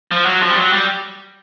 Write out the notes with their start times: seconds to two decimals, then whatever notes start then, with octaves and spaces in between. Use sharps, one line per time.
0.11 F3
0.26 F#3
0.42 F3
0.51 G3
0.57 F#3
0.73 G3